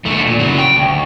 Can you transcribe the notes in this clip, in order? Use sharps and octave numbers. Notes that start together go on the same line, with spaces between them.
D#2 A3
A#2
C#3 F#3
G5
D2